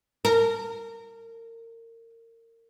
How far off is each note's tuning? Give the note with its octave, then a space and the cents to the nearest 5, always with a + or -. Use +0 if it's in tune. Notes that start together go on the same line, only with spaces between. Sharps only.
A#4 -30